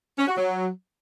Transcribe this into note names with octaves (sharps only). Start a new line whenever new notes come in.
C#4
F#4
F#3